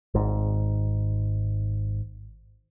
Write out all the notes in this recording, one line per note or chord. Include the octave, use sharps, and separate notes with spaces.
G#1 G#2